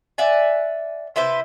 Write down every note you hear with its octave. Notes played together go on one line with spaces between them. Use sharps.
D5 E5 F#5 G#5
C3 E4 B4 C5